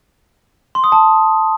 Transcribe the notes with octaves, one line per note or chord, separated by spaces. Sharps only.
C6
D#6
A5